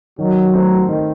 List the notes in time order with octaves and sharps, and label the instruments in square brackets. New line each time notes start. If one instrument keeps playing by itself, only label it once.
[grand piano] D#3 [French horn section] F#3
[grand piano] A3 C4
D#3